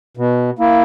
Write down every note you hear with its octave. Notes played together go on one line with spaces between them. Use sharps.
B2
A#3 E4